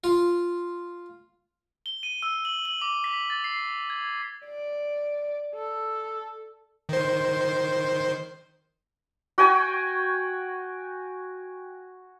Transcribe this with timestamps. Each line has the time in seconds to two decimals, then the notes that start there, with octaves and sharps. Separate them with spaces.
0.04 F4
1.86 G7
2.03 D#7
2.23 E6
2.45 F#7
2.65 F#7
2.82 D6
3.04 B6
3.30 A6
3.44 C7
3.90 G#6
4.46 D5
5.55 A4
6.89 D#3 C5
9.38 F#4 G5 G#5 C#6